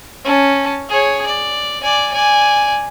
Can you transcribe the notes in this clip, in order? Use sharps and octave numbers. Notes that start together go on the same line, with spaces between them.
C#4 A5
G#4 C#5
D5
D5 G#5
D5 G#5